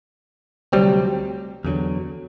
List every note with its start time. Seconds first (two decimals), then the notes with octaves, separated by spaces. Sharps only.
0.73 D2 C3 F#3 G3 C4
1.65 E2 D3 F#3